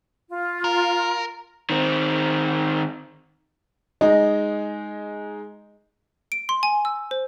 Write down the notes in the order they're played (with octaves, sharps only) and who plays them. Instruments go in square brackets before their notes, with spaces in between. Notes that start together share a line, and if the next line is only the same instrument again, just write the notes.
[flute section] F4
[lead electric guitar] A#4
[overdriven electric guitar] D#3 C4
[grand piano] G#3 D#4 [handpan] D#5
[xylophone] D7
C6
G#5
E6
C5